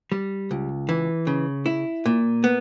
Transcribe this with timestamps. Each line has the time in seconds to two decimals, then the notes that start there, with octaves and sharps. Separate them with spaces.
0.12 G3
0.51 C#2
0.89 E3
1.27 C#3
1.66 E4
2.06 A#2
2.44 B3